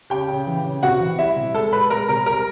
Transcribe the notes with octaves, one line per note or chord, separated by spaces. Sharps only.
C#3 G4 G5
C#3
E3
C#3
C3 F#4 F#5
E3
G3 E4 E5
C3
G#3 A4 A5
G#3 B4 B5
G#3 A#4 A#5
C3 A#4 A#5
G3 A#4 A#5